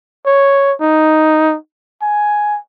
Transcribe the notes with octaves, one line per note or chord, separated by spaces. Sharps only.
C#5
D#4
G#5